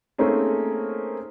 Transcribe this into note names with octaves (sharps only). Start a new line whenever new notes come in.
A3 A#3 C4 C#4 D#4 G#4